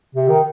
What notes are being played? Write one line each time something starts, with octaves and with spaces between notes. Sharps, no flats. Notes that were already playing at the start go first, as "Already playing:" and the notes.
C3
D#3